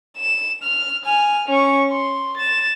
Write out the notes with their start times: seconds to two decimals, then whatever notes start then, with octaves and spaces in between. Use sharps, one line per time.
0.18 E7
0.63 F6
1.05 G#5 F6
1.48 C#4 C#6
1.92 C6
2.37 A6 E7